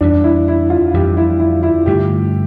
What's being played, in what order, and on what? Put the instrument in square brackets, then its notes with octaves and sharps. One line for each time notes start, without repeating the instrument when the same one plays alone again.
[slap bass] F2 E3 G3 [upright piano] D4
[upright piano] E4
E4
F4
[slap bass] F2 E3 G3 [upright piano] G4
[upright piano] E4
E4
E4
[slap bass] G2 D3 A3 [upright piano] G4